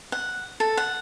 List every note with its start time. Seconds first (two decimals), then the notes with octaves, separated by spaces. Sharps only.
0.12 F#5
0.60 A4
0.77 F#5